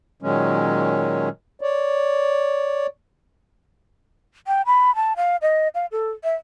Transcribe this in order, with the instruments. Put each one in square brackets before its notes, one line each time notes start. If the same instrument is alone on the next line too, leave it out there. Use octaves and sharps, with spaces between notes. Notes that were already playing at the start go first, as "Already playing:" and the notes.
[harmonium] A#2 D#3 F#3 G#3 C#4
C#5 D5
[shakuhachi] G5
B5
A5
F5
D#5
F5
A4
E5